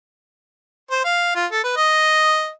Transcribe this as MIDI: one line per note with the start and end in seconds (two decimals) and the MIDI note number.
0.91 1.03 72
1.05 1.33 77
1.35 1.46 65
1.52 1.62 69
1.64 1.76 71
1.77 2.49 75